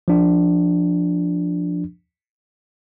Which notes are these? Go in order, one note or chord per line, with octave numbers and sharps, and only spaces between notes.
F3 D4